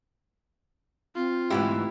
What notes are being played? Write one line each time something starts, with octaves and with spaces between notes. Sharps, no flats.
C4 F4
D2 G#2 E3 E4 G4